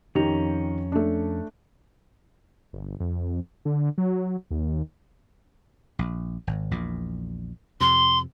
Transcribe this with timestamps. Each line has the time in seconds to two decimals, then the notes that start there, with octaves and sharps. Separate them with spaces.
0.15 F2 D#3 C#4 G4 A#5
0.92 A3 D4
2.73 G1
3.00 F2
3.65 D3
3.98 F#3
4.50 D#2
5.99 A#1
6.47 G#1
6.71 A#1 E2 A#2
7.80 F2 C3 C6